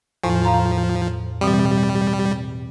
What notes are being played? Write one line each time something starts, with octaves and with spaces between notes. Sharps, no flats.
E2 A2 F3
F5 A#5 C6
B2 E3 G3 C4